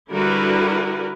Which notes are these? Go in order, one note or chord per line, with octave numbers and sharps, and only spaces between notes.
D3 G3 E4 F#4 A#4 B4